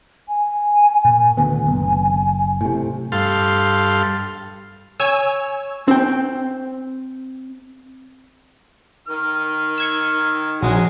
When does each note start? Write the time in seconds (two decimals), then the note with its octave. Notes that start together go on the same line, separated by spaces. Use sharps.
0.28 G#5
1.05 A#2
1.37 D2 D#3 B3 G#5
1.67 F#1
2.61 A2 C3
3.12 G2 A4 F5 C6
5.00 C#5 G#5 E6
5.88 C4 G5
9.08 D#3 F6
9.78 E6 G#6 C#7
10.62 A#1 F#3 G#3 F#4